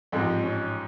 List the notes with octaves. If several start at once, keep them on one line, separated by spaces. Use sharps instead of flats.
A1 G#2 F3 C4
C#4